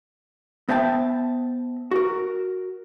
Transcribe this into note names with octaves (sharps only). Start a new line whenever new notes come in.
B3 C5 E5 G5 A5
F#4 A#4